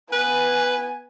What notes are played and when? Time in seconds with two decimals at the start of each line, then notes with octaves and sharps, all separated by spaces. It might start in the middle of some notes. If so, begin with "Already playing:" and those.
0.13 B3 B4 G#5